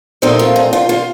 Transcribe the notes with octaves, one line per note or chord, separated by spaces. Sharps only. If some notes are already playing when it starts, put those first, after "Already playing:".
A#2 F3 A3 C4 D#4
F4
D#4
F4
F4